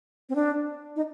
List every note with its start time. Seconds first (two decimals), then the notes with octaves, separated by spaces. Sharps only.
0.29 C4
0.35 D4
0.96 D#4